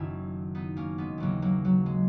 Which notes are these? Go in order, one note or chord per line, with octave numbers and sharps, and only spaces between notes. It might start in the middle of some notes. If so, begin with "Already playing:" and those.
Already playing: F#1 F#2 D#3 C#4 E4
B3 D#4
A#3 C#4
G#3 B3
D#2 C#3 E3 F#3 A#3
F#3 A#3
F#3
G#3